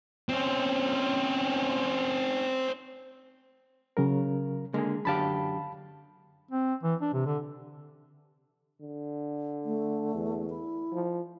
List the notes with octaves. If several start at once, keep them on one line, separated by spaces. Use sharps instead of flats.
C4 C#4
C#3 F#3 A#4
D3 G#3 A#3 G#4
F#2 D3 G4 F5 A5 B5
C4
E3
D4
C3
D3
D3
A3
E2
E4
F3